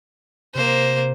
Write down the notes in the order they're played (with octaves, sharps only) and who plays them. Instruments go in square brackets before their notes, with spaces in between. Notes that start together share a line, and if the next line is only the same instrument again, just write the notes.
[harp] C3 [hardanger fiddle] A#3 C5